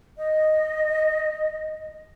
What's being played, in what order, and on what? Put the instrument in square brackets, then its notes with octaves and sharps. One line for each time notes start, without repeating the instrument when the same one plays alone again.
[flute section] D#5